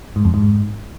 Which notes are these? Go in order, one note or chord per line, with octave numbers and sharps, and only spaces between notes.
G#2
F2
G#2